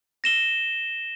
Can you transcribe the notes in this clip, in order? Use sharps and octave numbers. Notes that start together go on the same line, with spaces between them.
A#6 E7 G7